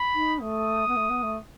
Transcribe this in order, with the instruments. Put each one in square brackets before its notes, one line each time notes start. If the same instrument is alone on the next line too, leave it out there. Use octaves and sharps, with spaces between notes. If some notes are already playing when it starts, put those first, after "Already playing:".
Already playing: [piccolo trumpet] B5
[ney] D#4
[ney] A3 [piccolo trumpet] D#6
[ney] B3
A3
B3
A3